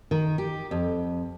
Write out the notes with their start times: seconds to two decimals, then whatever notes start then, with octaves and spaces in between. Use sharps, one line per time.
0.11 D#3
0.38 G4
0.71 F2